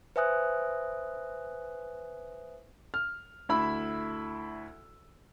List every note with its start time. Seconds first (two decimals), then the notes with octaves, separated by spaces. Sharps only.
0.16 B4 C5 E5 G#5 D#6 F#6
2.94 F6
3.49 D2 E4 E5 B5 E6